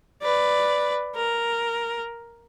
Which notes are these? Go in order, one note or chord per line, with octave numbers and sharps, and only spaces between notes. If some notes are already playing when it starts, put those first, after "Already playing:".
B4 D5
A#4